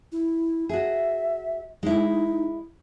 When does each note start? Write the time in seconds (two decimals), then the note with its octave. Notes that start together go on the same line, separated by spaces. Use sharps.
0.12 E4
0.69 F#4 G#4 E5
1.83 G#3 D#4 E4